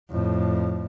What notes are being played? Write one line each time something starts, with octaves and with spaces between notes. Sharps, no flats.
F2 A2